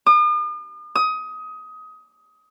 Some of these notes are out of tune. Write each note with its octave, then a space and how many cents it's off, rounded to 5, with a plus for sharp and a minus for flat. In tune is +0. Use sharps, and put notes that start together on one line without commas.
D#6 -45
D#6 +20